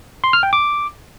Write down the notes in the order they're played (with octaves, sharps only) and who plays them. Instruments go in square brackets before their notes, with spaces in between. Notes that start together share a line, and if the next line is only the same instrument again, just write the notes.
[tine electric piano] C6
F6
G5
D6